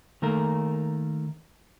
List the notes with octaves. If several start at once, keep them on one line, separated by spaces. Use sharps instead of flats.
D#3 A3 A#3 A#4